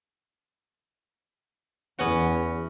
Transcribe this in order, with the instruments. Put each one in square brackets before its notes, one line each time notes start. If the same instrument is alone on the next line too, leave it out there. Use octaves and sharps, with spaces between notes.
[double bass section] E2 [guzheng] B3 C#4 F#4